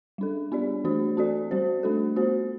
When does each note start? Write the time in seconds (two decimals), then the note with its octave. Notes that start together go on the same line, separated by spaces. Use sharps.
0.18 G3 D4 A4
0.52 B3 D4 G4 D5
0.84 E3 A3 D4 F#4 C5
1.17 C4 F#4 A4 D5
1.51 G3 C4 F#4 C5
1.83 A3 D4 F#4 A4
2.16 B3 F#4 C5